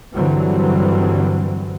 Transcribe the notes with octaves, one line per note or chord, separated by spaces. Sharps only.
G2 D3 E3 F#3 G3 C4